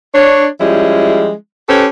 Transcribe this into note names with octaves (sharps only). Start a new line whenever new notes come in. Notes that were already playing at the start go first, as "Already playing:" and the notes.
D4 C#5
F3 G3 G#3 C#4 E4
C#4 G4 A4 B4 C5